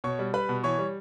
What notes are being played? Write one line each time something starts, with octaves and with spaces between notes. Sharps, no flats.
B2 C#5 C#6
G3
G3 B4 B5
B2
E3 C#5 C#6
G3